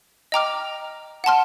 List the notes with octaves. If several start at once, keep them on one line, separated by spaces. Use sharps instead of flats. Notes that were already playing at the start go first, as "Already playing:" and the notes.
D#5 G5 A#5 D6 F6
F#5 A5 C6 F6